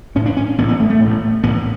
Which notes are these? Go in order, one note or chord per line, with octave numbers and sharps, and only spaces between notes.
A1 A2 C#4
D4
C#4
A1 A2 B3
B3
A3
A3
A2
A1
A1 A2 B3